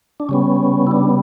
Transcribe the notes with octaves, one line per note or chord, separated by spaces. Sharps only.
D4
C#3 G3 B3 C#4
E4
D4